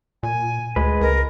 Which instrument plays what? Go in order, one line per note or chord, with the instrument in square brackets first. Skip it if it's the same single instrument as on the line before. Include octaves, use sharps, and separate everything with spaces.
[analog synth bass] A#2 [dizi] G#5
[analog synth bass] D2 [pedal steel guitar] G#3 B4
[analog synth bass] C#2 [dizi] A#4